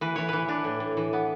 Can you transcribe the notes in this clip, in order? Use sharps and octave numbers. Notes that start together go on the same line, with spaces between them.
E3 B4
E3 C#5
E3 B4
D4
A2
A2
E3
B3